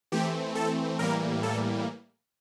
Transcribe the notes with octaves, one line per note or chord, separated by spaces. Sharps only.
E3 A3 C4 G4
A4
A2 E3 G3 A#3 A#4
A4